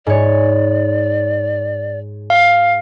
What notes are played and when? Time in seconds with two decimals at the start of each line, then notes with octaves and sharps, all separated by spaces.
0.07 G#2 C#5 D5
2.30 F5